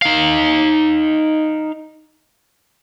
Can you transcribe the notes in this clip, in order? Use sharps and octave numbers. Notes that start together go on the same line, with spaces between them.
D#4 F5